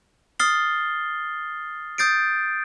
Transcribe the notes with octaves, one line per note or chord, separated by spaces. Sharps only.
D#6 F6 A6 C7 G7
D#6 G6 A6 C7 D7